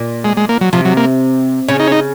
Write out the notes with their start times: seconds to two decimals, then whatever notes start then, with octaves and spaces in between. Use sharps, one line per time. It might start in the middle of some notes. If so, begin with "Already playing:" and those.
Already playing: A#2
0.24 G#3
0.37 G#3
0.49 A#3
0.61 F#3
0.73 C3 F3
0.85 F#3
0.97 A#3
1.68 C#3 C#4
1.80 D#4
1.87 C#4
1.92 D#4